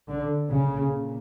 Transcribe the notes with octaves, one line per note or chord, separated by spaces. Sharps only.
D3
A#2 C#3